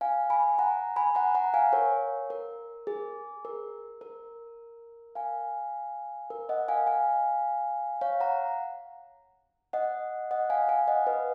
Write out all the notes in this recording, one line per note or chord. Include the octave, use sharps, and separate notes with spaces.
F5 G#5
G#5 B5
F#5 A#5
G#5 B5
F#5 A#5
F#5 A#5
F5 G#5
A#4 C#5
A#4
G#4
A#4
A#4
F5 G#5
A#4
D#5 F#5
F5 G#5
F5 G#5
C#5 F5
F#5 A#5
D#5 F#5
D#5 F#5
F5 G#5
F5 G#5
D#5 F#5
B4 D#5